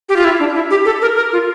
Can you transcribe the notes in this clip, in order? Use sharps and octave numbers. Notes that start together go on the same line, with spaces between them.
G4
F4
E4
D4
E4
G4
A4
A#4
A#4
F4